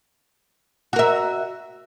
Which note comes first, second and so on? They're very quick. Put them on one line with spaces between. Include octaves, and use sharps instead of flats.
F#4 A#4 E5